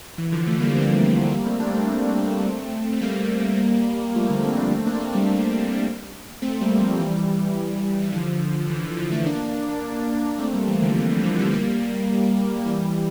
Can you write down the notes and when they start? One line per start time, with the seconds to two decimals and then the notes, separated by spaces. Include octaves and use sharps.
0.18 E3
0.32 D3 F3
0.46 F3 A3
0.60 G3 A#3
0.75 A3 C4
0.89 A3 C4
1.03 G3 A#3
1.31 G3 A#3
1.46 A3 C4
1.60 A#3 D4
1.74 A3 C4
2.92 A3
3.01 G3 A#3
4.15 F3 A3
4.30 D3
4.44 A3 C4
4.57 A#3 D4
4.72 A3 C4
4.86 A#3 D4
5.00 A3 C4
5.15 G3 A#3
6.42 A3 C4
6.61 G3 A#3
6.80 F3 A3
6.99 E3 G3
8.02 G3
8.12 D3 F3
8.69 E3
8.83 E3
8.97 D3 F3
9.11 F3 A3
9.26 A#3 D4
10.38 A3 C4
10.53 G3 A#3
10.67 E3 G3
10.82 D3 F3
10.95 E3
11.10 E3
11.24 D3 F3
11.39 E3 G3
11.52 G3 A#3
12.65 E3 G3